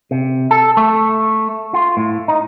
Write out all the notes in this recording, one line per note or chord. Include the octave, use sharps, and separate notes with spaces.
C3
A4
A3
F4
A2
D#4